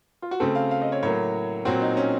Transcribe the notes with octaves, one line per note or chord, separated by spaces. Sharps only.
F4
F#4
C#3 A3 C4 A4
F5
F5
D#5
C#5
A2 F#3 A#3 C#5
A#2 F#3 C4 F#4
D#4
C#4